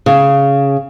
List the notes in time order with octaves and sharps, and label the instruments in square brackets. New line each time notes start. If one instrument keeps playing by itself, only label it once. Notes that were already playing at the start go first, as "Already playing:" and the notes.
[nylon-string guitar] C#3